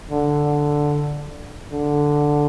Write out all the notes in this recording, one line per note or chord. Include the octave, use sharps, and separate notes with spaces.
D3
D3